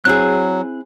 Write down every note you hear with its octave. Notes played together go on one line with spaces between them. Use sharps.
F#3 C4 E4 G#4 F#6